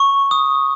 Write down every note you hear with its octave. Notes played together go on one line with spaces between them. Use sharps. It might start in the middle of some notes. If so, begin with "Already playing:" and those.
Already playing: C#6
D#6